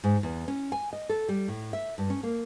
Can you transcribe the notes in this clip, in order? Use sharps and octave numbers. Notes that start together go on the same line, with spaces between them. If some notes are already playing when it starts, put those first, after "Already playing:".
G#2
E2
C#4
G#5
D#5
A4
G3
A2
E5
G2
C#4
A#3